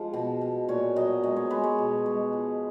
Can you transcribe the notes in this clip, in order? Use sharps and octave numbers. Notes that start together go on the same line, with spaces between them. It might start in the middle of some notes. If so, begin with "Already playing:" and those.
Already playing: F3 G#3
B2
B2
A#2 C#5
F#3 D#5
G#3 D#5
C#5
G#3 B4
C#5
B2
G#3
F3